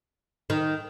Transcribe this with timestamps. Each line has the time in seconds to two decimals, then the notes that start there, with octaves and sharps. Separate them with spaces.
0.50 D#3